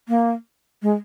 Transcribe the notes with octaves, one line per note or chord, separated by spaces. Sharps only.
A#3
G#3